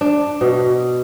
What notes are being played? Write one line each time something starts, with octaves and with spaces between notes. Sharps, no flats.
D4
B2